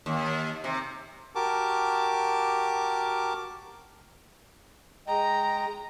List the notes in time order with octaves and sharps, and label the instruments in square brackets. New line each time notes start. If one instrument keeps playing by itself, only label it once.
[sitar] D#2
C3
[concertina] F#4 G4 A#4 A5 D6
[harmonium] G#3 D#5 G5 [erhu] A#5